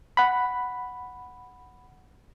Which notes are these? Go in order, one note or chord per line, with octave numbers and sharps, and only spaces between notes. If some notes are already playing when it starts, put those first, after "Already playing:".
F#5 B5